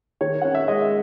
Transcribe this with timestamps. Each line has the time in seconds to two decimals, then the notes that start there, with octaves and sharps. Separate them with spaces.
0.21 D#3 C#5
0.42 C#4 F#5
0.55 E5
0.68 G#3 D#5